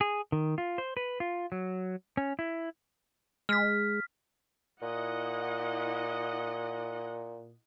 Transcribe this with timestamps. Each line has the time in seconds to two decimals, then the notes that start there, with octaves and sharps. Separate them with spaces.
0.01 G#4
0.32 D#3
0.58 F4
0.78 C5
0.97 B4
1.20 F4
1.52 F#3
2.17 C#4
2.39 E4
3.49 G#3 F6 B6
4.82 A#2 E4 D#5 F#5